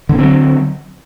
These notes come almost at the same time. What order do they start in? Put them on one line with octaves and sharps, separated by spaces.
D3 B3 C4 F#3